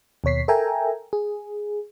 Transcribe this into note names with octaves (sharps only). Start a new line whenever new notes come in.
D#2 B2 C#5 B6 C7
A4 A#4 E5 G5 G#5 A#5
G#4